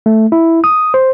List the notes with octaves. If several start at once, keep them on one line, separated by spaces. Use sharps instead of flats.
A3
E4
D#6
C5